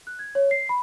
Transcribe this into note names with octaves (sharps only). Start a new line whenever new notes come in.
F#6
G#6
C#5
C7
B5